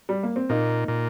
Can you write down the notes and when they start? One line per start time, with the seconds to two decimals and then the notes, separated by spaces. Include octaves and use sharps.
0.09 G3
0.23 A#3
0.36 C4
0.49 A#2 A#3 D#4
0.88 A#2